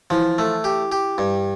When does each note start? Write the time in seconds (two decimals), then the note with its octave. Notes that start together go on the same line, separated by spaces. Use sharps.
0.10 E3 F3
0.38 A3
0.64 G4
0.92 G4
1.18 G2